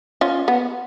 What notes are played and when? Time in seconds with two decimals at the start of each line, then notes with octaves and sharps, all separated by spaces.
0.21 C#4 F4
0.48 B3